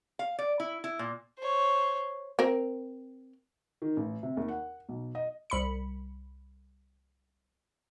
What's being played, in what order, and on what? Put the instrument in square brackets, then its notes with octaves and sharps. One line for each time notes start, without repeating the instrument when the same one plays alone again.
[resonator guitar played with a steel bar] F5
D5
E4
E4
A#2
[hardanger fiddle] C5 C#5
[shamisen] C4 A#4
[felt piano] D#3
A1
C3
D#2
F#5
B1
D#5
[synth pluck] C2 B5 C#7